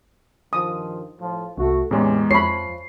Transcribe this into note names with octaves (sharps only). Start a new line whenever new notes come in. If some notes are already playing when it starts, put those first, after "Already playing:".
G2 D#3 F3 D#6
A2 F3
C2 A3 F#4
E2 A2 C3 G#3 C#4 G4
F2 F3 C#5 B5 C7